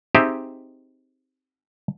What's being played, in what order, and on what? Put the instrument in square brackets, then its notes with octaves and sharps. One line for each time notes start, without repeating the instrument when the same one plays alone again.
[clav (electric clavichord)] C4 D#4 G4 G#4 D#5 E5